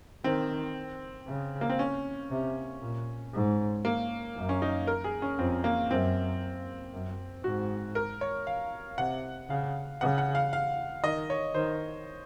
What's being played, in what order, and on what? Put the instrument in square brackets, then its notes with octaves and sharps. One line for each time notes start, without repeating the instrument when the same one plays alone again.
[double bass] D#3 [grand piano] C4
[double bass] C#3
[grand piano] A#3
C4
C#4
[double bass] C3
A#2
G#2
[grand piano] A#3
[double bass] F#2
[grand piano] C#4
D#4
A#4
G#4
C#4
[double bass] F2 [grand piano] C4
[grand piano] A#3
[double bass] F#2 [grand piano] C4
[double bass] F#2
[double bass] G#2 [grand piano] F#4
[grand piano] A#4
C#5
F5
[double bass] C3 [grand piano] F#5
[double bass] C#3 [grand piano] F5
[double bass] C#3 [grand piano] F#5
[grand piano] F#5
F5
F5
[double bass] D#3 [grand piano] D#5
[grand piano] C#5
[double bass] D#3 [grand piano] C5